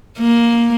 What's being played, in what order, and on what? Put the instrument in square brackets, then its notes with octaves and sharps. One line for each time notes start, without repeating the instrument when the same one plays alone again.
[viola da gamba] A#3